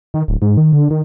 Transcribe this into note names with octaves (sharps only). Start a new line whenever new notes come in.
D#3
D1
G#2
D#3
D3
D#3